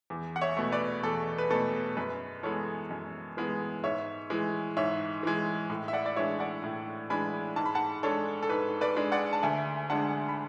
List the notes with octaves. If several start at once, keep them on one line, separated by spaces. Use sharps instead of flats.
E2
F#5
C#5 E5
B2 A3
B4 D5
E2 A4
B4
B2 A3 A4
F#2 B4
E3 G#3 B3 A4 C#5
F#2
E3 G#3 B3
G#2 C#5 E5
E3 G#3
G#2 C#5 E5
E3 G#3
A2
E5
D5 F#5
D5
E3 G#3 D4 C#5 E5
D5 F#5
A2
E3 G#3 D4 G#5 B5
G#2 A5
B5
F#5 A5
G#3 D4 A4 C#5
A4
G#2 B4
B4 D5
G#3 D4
D5 F#5
A5
D2 E5 G#5
D3 G#3 D4 F#5 A5
B5